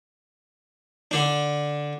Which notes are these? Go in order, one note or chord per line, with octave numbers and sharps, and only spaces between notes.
D3 D4